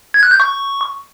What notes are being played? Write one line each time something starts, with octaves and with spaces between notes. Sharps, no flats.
G#6
F#6
G6
C#6